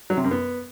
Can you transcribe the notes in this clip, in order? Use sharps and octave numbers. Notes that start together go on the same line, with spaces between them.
F#3
C3
F#2
B3